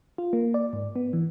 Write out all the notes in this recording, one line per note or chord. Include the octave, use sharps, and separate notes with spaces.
F4
A#3
D5
G#2
B3
E3